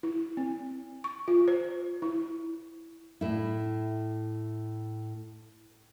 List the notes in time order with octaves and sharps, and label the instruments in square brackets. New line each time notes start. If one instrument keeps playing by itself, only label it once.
[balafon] E4
C4
C#6
F4
C5
E4
[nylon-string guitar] A2 E4